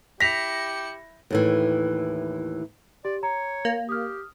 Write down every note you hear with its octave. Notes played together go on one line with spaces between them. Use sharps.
E4 G4 A#6 B6 C#7 F7
D#2 A2 E3
G4 D5
C#5 A#5
A#3
G4 D#6 F6